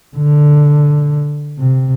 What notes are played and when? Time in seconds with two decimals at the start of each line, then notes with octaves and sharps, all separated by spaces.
0.17 D3
1.58 C3